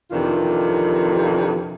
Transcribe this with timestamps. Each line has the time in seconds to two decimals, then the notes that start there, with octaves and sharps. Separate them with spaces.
0.11 F2 C3 D#3 E3 D4 F4